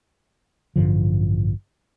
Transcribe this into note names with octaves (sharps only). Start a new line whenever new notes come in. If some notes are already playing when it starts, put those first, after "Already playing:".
A1 G2 D3 F3